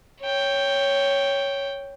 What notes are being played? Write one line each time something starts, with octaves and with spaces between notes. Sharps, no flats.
C#5 G5